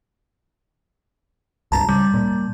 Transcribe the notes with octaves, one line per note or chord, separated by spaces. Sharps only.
C#2 G2 A5 A#5 A6
C#3 G3
A#2